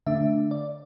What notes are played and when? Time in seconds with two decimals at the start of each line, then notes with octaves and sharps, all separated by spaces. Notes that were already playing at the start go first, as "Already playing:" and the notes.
0.07 D3 A3 D4 E5
0.51 D5